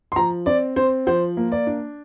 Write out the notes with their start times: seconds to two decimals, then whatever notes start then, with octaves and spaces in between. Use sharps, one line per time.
0.12 C6
0.16 F3 A#5
0.46 C4 D5
0.76 C4 C5
1.07 F3 C5
1.37 A#3
1.52 D5
1.67 D4